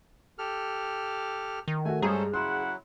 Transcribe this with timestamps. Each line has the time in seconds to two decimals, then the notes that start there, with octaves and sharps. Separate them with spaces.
0.39 G4 A4 F6
1.68 D#3
1.85 A3 F#4 G#5
2.02 G2 G#3 C#4 G#4 A4 C5 A#5
2.34 C#3 F#3 E4 F#5 C6